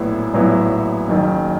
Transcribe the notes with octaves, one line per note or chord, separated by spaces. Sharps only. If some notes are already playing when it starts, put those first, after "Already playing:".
Already playing: A#1 A2 F#3 B3 E4
A#1 A2 F#3 B3 E4
F#1 F#2 D#3